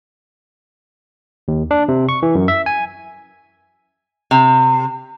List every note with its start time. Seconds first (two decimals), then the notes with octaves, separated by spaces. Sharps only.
1.48 D#2
1.71 D4
1.88 C3
2.09 C#6
2.23 E3
2.35 F#2
2.48 E5
2.66 G#5
4.31 C3